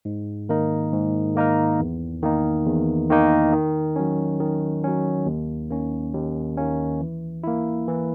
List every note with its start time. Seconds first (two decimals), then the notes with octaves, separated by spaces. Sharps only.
0.05 G#2
0.49 D#3 A#3 D#4 A#4
0.93 G#2
1.35 D#3 A#3 D#4 A#4
1.80 E2
2.23 D#3 A#3 D#4
2.66 E2
3.10 D#3 A#3 D#4
3.52 D#3
3.96 F#3 C#4
4.40 D#3
4.84 F#3 C#4
5.26 D#2
5.70 D#3 A#3 C#4
6.14 D#2
6.57 D#3 A#3 C#4
7.00 E3
7.43 A#3 E4
7.88 E3